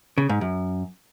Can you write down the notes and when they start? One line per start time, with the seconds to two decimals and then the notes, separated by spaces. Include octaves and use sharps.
0.18 C#3
0.29 G#2
0.41 F#2